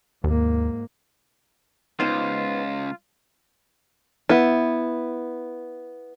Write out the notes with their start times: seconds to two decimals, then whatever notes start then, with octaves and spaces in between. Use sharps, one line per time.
0.24 D#2 G#2 A#3
2.00 C#2 B3 D#4 F4 C5
4.29 B3 E4